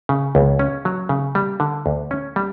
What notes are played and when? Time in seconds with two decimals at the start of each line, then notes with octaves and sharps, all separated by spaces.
0.09 C#3
0.35 C#2
0.59 C#4
0.85 F#3
1.09 C#3
1.35 G3
1.60 D3
1.86 D2
2.11 C#4
2.36 G3